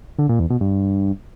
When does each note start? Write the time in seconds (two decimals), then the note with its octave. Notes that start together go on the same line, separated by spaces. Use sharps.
0.19 D3
0.29 A#2
0.40 E2
0.50 B2
0.61 G2